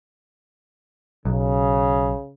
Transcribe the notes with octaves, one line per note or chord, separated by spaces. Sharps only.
B1 C#3